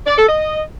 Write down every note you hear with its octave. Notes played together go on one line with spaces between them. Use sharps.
D5
A4
D#5